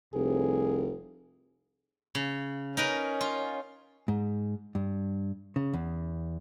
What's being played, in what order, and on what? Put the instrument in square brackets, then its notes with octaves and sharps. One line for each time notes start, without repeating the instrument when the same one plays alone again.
[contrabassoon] F1 [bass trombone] C2 [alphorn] G#4
[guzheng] C#3
[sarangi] C#4 [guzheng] D#4 A#4 B4
[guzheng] F4
[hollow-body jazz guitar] G#2
G2
C#3
E2